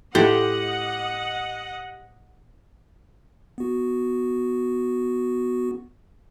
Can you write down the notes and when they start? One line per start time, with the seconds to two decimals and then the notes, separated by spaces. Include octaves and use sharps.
0.15 A2 G4 C5 D#5 F#5
3.58 B3 F#4